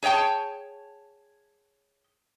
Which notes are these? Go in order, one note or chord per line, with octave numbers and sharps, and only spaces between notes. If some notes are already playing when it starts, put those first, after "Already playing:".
G#4 C#5 D5 G5 A5